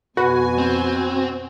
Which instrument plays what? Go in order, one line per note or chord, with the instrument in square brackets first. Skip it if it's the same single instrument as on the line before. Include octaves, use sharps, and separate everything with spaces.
[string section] F2 B2 G#5 [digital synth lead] F#4 [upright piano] B4
[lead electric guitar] C4